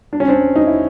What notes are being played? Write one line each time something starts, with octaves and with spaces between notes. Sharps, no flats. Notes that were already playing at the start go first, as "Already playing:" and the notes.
D4
C#4
C4 D4
D#4
E4